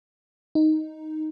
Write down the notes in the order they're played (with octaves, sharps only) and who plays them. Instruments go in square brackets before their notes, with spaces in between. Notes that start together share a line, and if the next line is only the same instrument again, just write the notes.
[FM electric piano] D#4